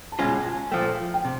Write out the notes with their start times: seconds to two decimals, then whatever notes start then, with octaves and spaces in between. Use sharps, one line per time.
0.12 A5
0.19 C#2 B2 G#3 C#4 F4 G#5
0.44 G#5
0.71 A#2 F3 A3 G5
1.14 G5
1.25 C3